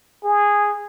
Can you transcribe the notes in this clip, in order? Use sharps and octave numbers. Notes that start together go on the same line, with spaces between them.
G#4